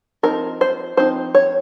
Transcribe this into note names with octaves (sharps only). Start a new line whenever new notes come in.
F3 C4 D#4 A#4
C5
F3 C4 D#4 C5
C#5